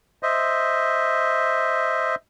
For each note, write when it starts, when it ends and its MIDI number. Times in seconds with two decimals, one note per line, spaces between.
0.23 2.15 72
0.23 2.15 75
0.23 2.15 76